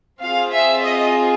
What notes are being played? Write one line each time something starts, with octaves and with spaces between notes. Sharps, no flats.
C4 F4 G#4 F5
E5
D#5